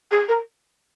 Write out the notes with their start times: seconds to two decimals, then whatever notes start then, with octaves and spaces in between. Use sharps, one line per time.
0.11 G#4
0.28 A#4